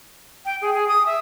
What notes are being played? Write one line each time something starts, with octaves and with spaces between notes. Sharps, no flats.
G5
G#4
G#4
D#6
E5